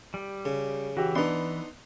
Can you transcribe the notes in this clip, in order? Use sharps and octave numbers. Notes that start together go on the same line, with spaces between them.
G3
C#3
E3 F#4 G4
B3 D4 D#4 C6